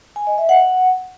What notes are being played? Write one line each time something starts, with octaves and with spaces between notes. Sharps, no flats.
G#5
D#5
E5
F#5